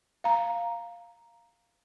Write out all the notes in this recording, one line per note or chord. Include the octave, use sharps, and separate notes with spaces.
F5 A#5